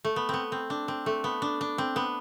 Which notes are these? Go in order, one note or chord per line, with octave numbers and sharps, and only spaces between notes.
A3
B3
B3 C4
C4
D4
C4
A3
B3
D4
D4
C4
B3